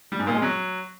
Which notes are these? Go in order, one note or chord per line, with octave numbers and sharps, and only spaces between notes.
G3
G#2
A#2
G#3
F#3